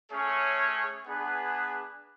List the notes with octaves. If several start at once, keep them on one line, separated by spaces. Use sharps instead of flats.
A3 C#4 G#4 C#5
B3 D4 G#4 B4